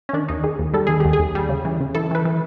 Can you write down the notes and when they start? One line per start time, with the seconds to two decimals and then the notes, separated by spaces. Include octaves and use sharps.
0.09 C#4
0.13 D#3 D4
0.28 D#2 D#4
0.44 D#3 G#4
0.59 D#2
0.74 G3 A4
0.87 D#3 G#4
1.00 D#2 G4
1.13 G#4
1.19 D#2
1.35 G3
1.49 C#3
1.65 E3
1.81 C#3
1.95 E3 A4
2.11 E3 B4
2.25 E3